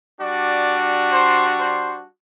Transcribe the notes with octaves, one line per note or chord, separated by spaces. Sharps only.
G3 D4 F#4 D5
C5
C5